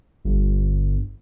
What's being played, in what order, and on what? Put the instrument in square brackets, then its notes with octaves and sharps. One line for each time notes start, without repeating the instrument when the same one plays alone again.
[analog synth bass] G1